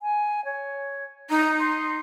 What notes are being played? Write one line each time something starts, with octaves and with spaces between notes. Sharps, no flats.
G#5
C#5
D#4 A#5
C6